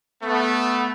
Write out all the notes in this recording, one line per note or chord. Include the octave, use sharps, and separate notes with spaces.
A3 B3